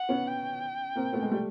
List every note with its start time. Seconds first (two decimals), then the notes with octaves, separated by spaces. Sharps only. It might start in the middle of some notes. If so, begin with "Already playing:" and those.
Already playing: F#5
0.09 B3 C#4
0.27 G5
0.96 A#3 C4
1.13 A3 B3
1.22 G#3
1.31 G3 A3